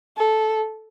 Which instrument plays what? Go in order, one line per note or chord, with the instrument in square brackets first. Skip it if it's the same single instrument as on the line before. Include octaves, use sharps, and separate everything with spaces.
[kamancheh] A4